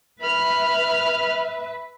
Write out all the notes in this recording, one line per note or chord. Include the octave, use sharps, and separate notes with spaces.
B4 E5 B5 F6